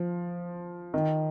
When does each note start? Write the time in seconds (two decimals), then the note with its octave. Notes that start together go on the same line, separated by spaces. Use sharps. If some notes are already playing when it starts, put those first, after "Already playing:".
Already playing: F3
0.94 D#3